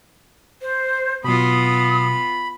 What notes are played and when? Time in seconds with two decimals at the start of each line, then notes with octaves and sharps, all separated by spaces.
0.62 C5
1.24 B2 F#3 B3 F4 B5 D#6